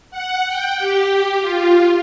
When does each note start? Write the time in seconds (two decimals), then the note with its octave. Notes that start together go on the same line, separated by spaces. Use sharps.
0.11 F#5
0.47 G5
0.79 G4
1.41 F4